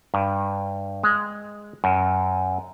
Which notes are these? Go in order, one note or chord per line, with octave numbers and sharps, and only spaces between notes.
G2
G#3
F#2